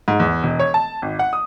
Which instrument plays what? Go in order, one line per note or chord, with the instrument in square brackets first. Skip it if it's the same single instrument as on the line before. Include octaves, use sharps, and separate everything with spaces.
[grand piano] G#2
E2
E1
C#5
A5
G#1
F#5
D#6